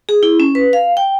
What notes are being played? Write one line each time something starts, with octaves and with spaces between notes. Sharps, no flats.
G#4
E4
C#4
B4
F5
G5